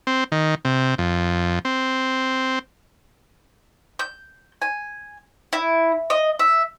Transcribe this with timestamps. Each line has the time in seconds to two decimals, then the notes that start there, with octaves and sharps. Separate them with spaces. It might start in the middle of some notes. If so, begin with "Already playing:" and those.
0.07 C4
0.32 D#3
0.65 C3
0.98 F2
1.65 C4
3.99 G6
4.62 G#5
5.53 E4
6.10 D#5
6.39 E5